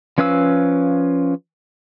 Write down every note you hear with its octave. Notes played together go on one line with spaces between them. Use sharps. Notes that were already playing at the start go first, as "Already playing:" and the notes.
F3 C#4 B4 F5 E6